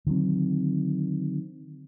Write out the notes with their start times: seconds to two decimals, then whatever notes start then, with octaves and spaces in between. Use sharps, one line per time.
0.07 D3 D#3 F#3 C4